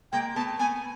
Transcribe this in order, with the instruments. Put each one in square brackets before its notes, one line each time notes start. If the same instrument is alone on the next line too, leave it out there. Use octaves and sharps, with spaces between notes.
[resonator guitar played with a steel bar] G#3 A#3 [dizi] G5
[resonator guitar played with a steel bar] A3 B3 [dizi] A5
[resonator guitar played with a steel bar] A3 B3 [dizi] G#5